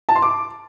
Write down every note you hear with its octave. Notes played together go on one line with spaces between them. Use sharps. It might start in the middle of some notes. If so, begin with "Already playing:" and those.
A5
C6
D6